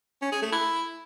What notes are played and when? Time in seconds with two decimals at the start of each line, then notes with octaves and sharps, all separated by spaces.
0.22 C#4
0.32 G#4
0.42 A3
0.52 E4